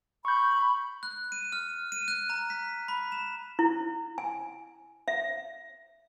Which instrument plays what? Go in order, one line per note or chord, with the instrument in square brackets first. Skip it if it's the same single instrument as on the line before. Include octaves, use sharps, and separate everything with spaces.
[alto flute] B5 [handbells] C#6 G6
[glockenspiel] F#6
D#7
F6
D#7
F#6
A#5
B6
B5
E7
[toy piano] E4
G#5
E5